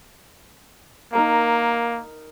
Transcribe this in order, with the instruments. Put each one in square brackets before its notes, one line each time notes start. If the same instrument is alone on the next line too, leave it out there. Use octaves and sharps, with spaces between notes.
[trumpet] A#3 [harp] D#4 A#4 A#5